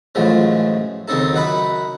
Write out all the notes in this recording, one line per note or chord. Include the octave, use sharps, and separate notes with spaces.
A1 F#2 F3 G#3 A3
D#2 C#3 C4 D#4 A4
F#2 D#4 F#5 B5